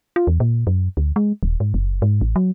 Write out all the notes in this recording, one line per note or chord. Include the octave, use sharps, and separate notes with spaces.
F4
E2
A#2
F#2
D2
G#3
D#1
G#2
F#1
G#2
A1
F#3